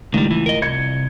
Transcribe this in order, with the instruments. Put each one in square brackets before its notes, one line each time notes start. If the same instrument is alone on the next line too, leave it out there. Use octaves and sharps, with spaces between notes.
[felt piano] C#2 A2 [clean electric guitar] D#3 G3
[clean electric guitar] E3
A#4 D#5
[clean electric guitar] C2 [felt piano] G#6 C#7